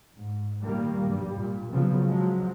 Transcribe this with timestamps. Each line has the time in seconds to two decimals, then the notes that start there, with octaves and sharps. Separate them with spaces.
0.15 G#2
0.64 A#2 D#3 G3 A#3
1.07 G2 G3
1.37 A#2
1.72 C#3 F3 F#3 B3
2.07 F3 F#3 G#3